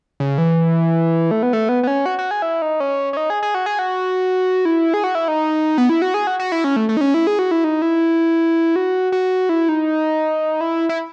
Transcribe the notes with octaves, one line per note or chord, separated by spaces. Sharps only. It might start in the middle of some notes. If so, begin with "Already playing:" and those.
C#3
E3
A3
B3
A3
B3
B3
C#4
F#4
F#4
G#4
E4
D#4
C#4
C#4
D#4
G#4
G#4
F#4
G#4
F#4
E4
G#4
F#4
E4
D#4
B3
E4
F#4
G#4
F#4
F#4
E4
C#4
A3
A3
D#4
C#4
E4
G#4
F#4
E4
D#4
E4
F#4
F#4
E4
D#4
E4
E4